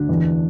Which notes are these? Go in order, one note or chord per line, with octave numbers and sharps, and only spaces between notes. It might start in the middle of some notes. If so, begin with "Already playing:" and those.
Already playing: D2 D4
E2